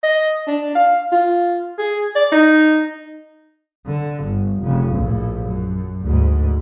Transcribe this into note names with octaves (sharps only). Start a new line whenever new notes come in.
D#5
D4
F5
F4
G#4
D5
D#4
D3
G1
F1 C#3
A#1 A2
F#2
D2 G#2